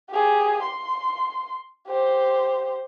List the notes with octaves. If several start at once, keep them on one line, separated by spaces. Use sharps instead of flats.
G4 G#4
C6
G4 C5